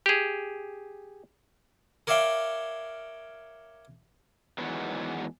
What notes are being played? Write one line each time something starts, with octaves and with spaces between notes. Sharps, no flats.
G4 G#4
A#4 C#5 D5 E5 F5 G5
E2 D#3 E3 F#3 G#3 B3